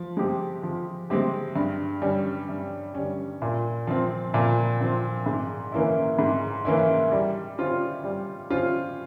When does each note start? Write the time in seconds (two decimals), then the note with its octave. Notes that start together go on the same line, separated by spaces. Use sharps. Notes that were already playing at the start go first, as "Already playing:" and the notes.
Already playing: F3
0.17 G#3 C4 G4
0.63 F3
1.10 G#3 C4 G4
1.56 G2
2.02 G3 C#4
2.49 G2
2.95 G3 C#4
3.42 A#2
3.87 F3 C4
4.34 A#2
4.80 F3 C4
5.26 G#2
5.72 E3 A#3 C#4 E4
6.19 G#2
6.65 E3 A#3 C#4 E4
7.12 G3
7.58 C#4 F4 C5
8.04 G3
8.50 C#4 F4 C5